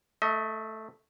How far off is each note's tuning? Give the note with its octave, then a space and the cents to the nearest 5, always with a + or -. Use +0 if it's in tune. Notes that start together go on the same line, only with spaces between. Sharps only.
A3 +0 D#5 +35